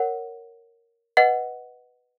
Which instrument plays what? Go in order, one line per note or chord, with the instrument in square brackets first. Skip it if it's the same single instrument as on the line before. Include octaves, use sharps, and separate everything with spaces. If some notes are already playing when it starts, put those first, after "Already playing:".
Already playing: [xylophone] A#4 C#5 F#5
B4 D#5 F#5